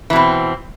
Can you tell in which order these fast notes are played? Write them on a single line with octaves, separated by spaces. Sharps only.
E3 B2 C4